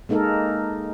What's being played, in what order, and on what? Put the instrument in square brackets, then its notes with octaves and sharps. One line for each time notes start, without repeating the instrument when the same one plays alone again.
[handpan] G#3 A#3 D#4 A4 A#4